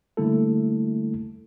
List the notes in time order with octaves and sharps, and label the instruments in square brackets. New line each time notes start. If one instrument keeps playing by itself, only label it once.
[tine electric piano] D3 G3 A3 A#3 E4 A4